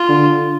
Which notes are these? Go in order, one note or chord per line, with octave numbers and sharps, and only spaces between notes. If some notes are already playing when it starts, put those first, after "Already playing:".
Already playing: F4
D3